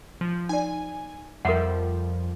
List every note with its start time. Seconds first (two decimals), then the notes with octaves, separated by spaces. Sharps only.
0.21 F3
0.49 D#4 D5 G#5
1.45 F2 F3 G3 A#4 E5 F#5